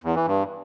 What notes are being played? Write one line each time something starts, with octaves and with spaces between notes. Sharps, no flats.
E2
E3
G2